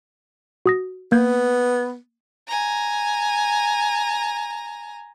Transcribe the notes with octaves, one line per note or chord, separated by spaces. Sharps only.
F#4 D#6 A#6
A#3 B3 G6 G#6
G#5 A#5